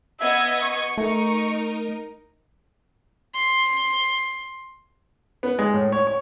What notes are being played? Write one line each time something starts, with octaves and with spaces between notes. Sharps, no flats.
B3 D#5 E5 G#6
C#6
A3 D#4 A#4
C6
B3
G#3
A2
C#5
C#5